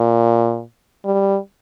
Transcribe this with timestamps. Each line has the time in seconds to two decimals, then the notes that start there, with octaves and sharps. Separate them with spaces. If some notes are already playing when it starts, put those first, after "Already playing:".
Already playing: A#2
1.05 G3